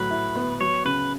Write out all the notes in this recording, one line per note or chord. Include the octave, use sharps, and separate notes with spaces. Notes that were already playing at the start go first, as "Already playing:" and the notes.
Already playing: A2 F#3 B4
E4
B3
F#3 C#5
C#3 B4